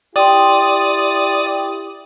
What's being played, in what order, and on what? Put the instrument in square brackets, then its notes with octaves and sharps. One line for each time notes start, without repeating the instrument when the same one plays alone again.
[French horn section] E4 G4 [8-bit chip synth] D5 D#6 [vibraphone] G5 C6